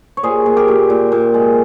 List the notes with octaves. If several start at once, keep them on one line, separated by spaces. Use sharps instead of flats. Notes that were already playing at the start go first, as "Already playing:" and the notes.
C#5
A#2 G#4 C5
A#2
G4 A#4
A#2
A#2
A#2
G#3